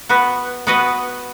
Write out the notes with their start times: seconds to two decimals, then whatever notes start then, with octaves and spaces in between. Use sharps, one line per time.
0.09 B3 F#4 B4
0.67 B3 F#4 B4 D#5